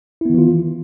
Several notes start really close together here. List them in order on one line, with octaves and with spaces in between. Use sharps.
E4 B3 D#3 E3 F4